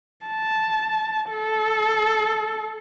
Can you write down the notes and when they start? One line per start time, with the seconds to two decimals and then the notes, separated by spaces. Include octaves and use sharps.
0.26 A5
1.30 A4